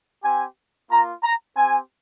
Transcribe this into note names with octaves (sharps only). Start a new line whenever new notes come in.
C4 G4 G#5
A#3 F4 A#5
A#5
C4 G4 G#5